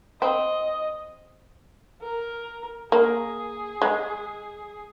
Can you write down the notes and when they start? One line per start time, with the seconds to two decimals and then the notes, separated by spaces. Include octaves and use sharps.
0.21 C4 D#5
2.02 A#4
2.92 A#3 G#4
3.82 G#3